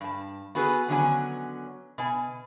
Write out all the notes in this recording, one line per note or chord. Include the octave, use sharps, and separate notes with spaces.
G2 A5
B3 F#4 G#4 A4 B4
D3 D#3 F#3 B3 C#4 G#5
B2 G#5